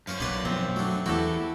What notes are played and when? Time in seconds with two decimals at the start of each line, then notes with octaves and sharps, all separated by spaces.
0.07 F#2 C#4 C5 F5
0.20 B1 A#2 B4 C#5 D5 C6
0.45 B2 F3 C4
0.76 F#3 A3 D4
1.06 E2 E3 E4 F#4 G4 A4